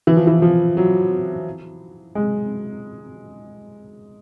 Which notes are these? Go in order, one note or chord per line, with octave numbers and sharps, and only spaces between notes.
E3
F3
E3
F3
F#3
G#3